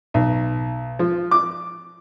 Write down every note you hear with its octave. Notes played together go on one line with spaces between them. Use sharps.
B1
F3
D6